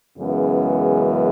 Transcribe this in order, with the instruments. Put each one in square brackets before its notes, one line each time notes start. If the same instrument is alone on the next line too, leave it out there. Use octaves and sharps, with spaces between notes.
[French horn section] F#2 C#3 E3 G#3 B3